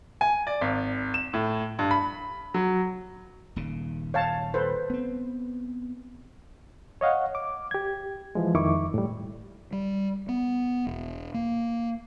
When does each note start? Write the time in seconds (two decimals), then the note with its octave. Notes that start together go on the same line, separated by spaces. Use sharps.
0.21 G#5
0.47 D5
0.61 G#1
1.14 E7
1.34 A2
1.79 G2
1.91 B5
2.54 F#3
3.56 D#1 D#2 C#3
4.14 C#5 F5 A5
4.54 A4 B4 C5
4.90 B3 C4
7.01 C#5 D#5 F5 F#5
7.35 D6
7.71 G4 G#6
8.35 E3 F3 G#3
8.55 F2 D#3 E4 C#6 D6
8.94 A2 G3
9.73 G3
10.29 B3
10.87 E1
11.34 A#3